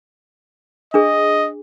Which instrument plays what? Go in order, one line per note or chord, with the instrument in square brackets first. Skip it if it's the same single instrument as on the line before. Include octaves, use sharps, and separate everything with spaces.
[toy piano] D4 G#4 [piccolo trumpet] D#5